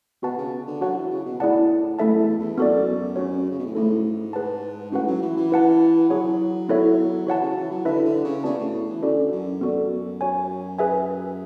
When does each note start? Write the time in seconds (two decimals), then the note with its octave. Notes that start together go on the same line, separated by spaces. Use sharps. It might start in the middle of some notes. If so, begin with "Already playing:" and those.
0.22 B2 B3 F#4 B4 F#5 A5
0.38 C#3
0.67 D3
0.81 F#3 D4 F#4 C#5 F#5 A5
0.96 E3
1.11 C#3
1.25 B2
1.40 A2 E4 G#4 D5 F#5 A5
1.99 F#2 A3 E4 A4 E5 A5
2.19 E2
2.38 E2
2.58 F#2 B3 F#4 A4 D5
3.16 C#4 F#4 C#5
3.50 C#3
3.59 B2
3.66 A2
3.75 G#2 A3 E4 A4
4.33 G#4 B4 F#5 A5
4.92 A2 C#4 F#4 B4 F#5
5.07 F#3
5.22 E3
5.37 E3
5.51 E4 B4 F#5 A5
6.09 F#3 E4 G#4 C#5 F#5
6.69 B3 E4 A4 C#5 E5
7.27 E3 F#4 C#5 F#5 A5
7.41 C#3
7.56 E3
7.71 F#3
7.85 D3 E4 B4 E5
8.04 D3
8.24 C#3
8.44 C#3 B3 F#4 B4 D5 A5
8.58 A2
8.88 E3
9.02 D3 C#4 F#4 A4 D5
9.32 F#2
9.61 F#2 B3 F#4 A4 D5
10.21 F#4 C#5 G#5
10.79 G#4 B4 E5 G#5